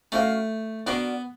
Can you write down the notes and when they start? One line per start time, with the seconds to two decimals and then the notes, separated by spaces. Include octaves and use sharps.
0.12 A3 C#4 F#4 A#4 D5 F5
0.86 B3 D4 F#4 A#4 D5